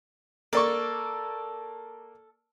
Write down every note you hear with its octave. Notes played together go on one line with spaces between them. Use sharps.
A#3 A4 D5 C#6